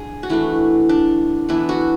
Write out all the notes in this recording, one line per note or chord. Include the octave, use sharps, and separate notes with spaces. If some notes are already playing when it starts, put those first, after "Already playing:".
Already playing: F#3 D4 G#4
F#4
E3 A3 D4 E4
D4
E3 B3 D4 E4
F#4